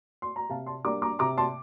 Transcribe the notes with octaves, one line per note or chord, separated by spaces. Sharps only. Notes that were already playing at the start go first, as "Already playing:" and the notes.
C6
A#5
C3 F5 A5
A5 C6
G3 A#3 D4 A#5 D6
A#5 D6
C3 A#5 D6
A5 C6